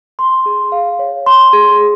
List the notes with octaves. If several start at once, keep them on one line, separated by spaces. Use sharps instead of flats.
C6
G#4
F5
C#5
C6
G#4